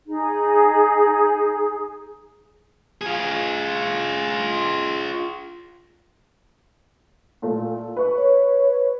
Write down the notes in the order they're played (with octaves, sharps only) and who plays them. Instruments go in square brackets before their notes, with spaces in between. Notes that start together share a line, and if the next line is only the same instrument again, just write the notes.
[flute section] D#4 G#4
[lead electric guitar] F4 G#4
[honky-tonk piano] A#2 A3
B4 C#6
[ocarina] C#5